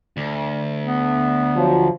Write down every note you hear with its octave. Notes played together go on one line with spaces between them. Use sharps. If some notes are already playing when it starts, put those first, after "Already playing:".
D2
B3
F3 F#3